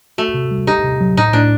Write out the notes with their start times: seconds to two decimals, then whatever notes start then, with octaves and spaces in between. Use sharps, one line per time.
0.18 A3 F#4
0.34 C3
0.51 G3
0.67 D#4 G4
0.84 C3
1.01 F#3
1.17 A2 D#4
1.33 A2 D4